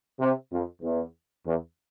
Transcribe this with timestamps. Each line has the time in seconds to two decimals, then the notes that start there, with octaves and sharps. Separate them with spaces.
0.19 C3
0.51 F2
0.82 E2
1.44 E2